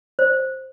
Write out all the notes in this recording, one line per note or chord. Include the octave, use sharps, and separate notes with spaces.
C5